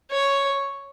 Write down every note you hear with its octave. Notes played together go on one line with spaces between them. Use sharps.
C#5